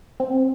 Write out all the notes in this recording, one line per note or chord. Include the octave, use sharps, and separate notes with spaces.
C4